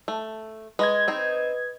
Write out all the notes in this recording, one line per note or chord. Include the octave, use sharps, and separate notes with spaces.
A3
G#3 B4 D#5 G#6
C4 D#4